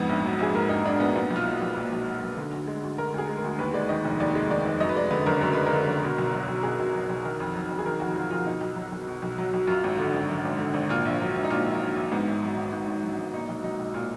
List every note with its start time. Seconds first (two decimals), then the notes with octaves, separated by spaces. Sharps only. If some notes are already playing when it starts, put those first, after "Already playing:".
Already playing: F2 G#2 B3
0.09 A#1
0.24 F#3
0.39 A#1 G#4
0.54 G#2 A#4
0.69 A#1 D#4
0.85 F#3 D4
1.00 A#1 B3
1.15 A#2 B3
1.30 B1
1.36 F4
1.45 F#3
1.62 B1
1.77 A#2
1.92 B1
2.07 F#3
2.23 B1
2.37 D3
2.53 D2
2.67 G#3
2.83 D2
2.98 D3 A#4
3.14 D2 G#4
3.29 G#3
3.38 A#4
3.44 D2
3.58 D#2 B4
3.74 G#3 D5
3.89 D#3 D#5
4.05 F1
4.20 D#2 D5
4.35 G#3
4.50 D#3 D5
4.66 F1
4.80 F#2 D#5
4.89 B4
4.95 G#3 D5
5.11 D3 B4
5.26 F#1 A#4
5.41 F#2 A#4
5.53 G#3 B4
5.66 A#4
5.73 D3
5.88 F#1
6.03 B2
6.18 B1
6.33 F#3
6.48 B1
6.63 B2 G#4
6.79 B1
6.95 F#3
7.09 B1
7.25 D#3 A#4
7.40 F2
7.55 F#3
7.70 F2
7.79 G#4
7.86 D#3 A#4
8.00 F2 F#4
8.15 F#3 F4
8.31 F2 F4
8.46 B2 D#4
8.61 B1
8.76 F#3
8.92 B1
9.07 B2
9.22 B1
9.38 F#3
9.53 B1
9.67 F#2 F4
9.84 G#1
9.99 D3
10.14 G#1
10.29 F#2
10.45 G#1
10.59 D3
10.74 G#1
10.89 A#2 F4
11.05 A#1
11.20 F#3
11.36 A#1
11.44 D#4
11.50 A#2 F4
11.66 A#1
11.81 F#3
11.96 A#1
12.12 G#2 B3
12.27 G#1
12.42 F#3
12.57 G#1
12.73 G#2
12.87 G#1
13.03 F#3
13.19 G#1
13.33 A#2 D#4
13.48 B1
13.63 F#3 D#4
13.79 B1
13.94 A#2 F4